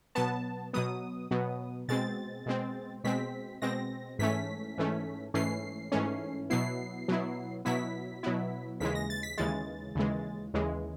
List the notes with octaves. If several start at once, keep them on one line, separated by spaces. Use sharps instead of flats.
B2 F#3 B3 A5
B2 F#3 B3 D#6
B2 F#3 B3
B2 G#3 C4 A6
B2 G#3 C4
B2 G#3 C4 B6
B2 G#3 C4 A#6
G#2 E3 A3 C#4 B6
G#2 E3 A3 C#4
G#2 E3 A3 C#4 C7
G#2 E3 A3 C#4
B2 F#3 B3 E4 C7
B2 F#3 B3 E4
B2 F#3 B3 E4 B6
B2 F#3 B3 E4
D#2 C#3 E3 G#3 B6
A#6
A6
B6
D#2 C#3 E3 G#3 A6
D#2 C#3 E3 G#3
D#2 C#3 E3 G#3